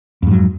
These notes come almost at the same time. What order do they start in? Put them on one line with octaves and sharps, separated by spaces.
F2 G#2 F#3